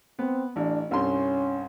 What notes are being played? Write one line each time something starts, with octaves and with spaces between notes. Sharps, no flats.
B3 C4
A1 D4
C2 G2 C#4 C6